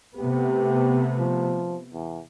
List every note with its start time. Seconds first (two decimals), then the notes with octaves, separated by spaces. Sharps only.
0.17 C3 A3 B3 G4
1.19 F3
1.93 E2